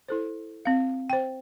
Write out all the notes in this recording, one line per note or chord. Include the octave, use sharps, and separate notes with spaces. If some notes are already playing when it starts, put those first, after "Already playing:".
E4 A4 C5
C4 F5
C5 G5